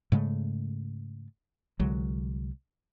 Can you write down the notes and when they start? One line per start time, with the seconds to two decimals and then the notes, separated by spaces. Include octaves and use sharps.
0.12 G#2 C#3 G#3 A3
1.79 C2 D3 F#3 G#3